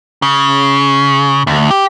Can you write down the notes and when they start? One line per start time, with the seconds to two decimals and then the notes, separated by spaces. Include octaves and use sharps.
0.22 C#3
1.47 D2
1.70 G4